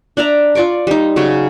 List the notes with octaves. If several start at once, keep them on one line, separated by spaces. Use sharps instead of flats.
D4 D5 E5 A#5
F4 D5 C#6 D6
G3 D#4
C#3 F#3 C#4